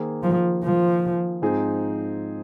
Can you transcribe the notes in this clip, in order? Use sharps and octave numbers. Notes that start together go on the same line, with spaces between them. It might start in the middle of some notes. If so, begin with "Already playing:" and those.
Already playing: D#3 A#3 G#4 C5
F3
F3
G#2 F3 C4 D#4 G#4